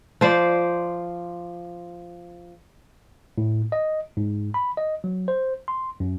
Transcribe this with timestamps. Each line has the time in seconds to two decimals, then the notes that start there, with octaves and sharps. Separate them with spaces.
0.21 F3 C5 D5
3.38 A2
3.72 D#5
4.17 G#2
4.54 B5
4.77 D#5
5.04 F#3
5.28 C5
5.68 C6
6.00 F#2